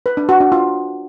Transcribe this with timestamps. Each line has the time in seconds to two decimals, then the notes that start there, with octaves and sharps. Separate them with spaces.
0.06 B4
0.17 D4
0.29 F#4
0.40 D4
0.52 F4